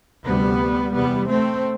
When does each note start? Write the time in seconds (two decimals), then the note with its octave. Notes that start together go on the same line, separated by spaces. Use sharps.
0.25 D2 C3 G3 B3
0.94 E2 C3 G3 B3
1.29 A3 C4